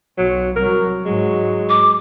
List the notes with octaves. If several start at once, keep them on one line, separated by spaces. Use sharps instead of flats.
B1 F#3
C2 F#3 A#4
G#2 F#3 G#3
D6